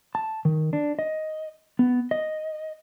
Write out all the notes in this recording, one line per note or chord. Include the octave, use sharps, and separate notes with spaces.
A5
D#3
D4
D#5
B3
D#5